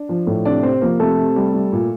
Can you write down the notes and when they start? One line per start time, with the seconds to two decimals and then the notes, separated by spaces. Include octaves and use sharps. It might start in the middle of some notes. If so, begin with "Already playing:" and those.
Already playing: D4
0.09 F3
0.27 A2
0.45 C3 D4 D5
0.63 C3 C4 C5
0.81 F3 A#3 A#4
1.00 C3 A3 A4
1.18 C3
1.36 G3
1.54 G3
1.72 A#2